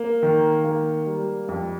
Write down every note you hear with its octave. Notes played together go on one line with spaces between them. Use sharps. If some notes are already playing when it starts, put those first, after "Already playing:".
Already playing: A#3
D#3
A#3
G3
F2